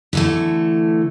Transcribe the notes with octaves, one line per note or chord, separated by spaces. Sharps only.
D3 E3 A3